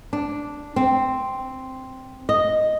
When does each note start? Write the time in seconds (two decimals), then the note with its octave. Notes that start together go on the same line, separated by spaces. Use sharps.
0.13 D4
0.76 C4
2.29 D#5